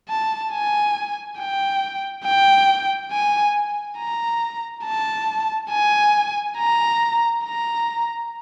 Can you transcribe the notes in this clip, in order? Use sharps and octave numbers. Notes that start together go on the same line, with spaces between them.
A5
G#5
G5
G5
G#5
A#5
A5
G#5
A#5
A#5